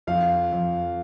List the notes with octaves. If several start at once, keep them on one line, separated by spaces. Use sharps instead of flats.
F2 F5
F2